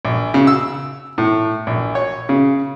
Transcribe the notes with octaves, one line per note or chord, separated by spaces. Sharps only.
A#1
C#3
E6
A2
A#1
C#5
C#3